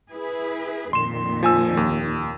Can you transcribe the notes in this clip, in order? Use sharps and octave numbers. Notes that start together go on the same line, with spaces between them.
E4 G#4 B4
F2 A#2 D#3 C6 E7
F3 G#5 E6
D#2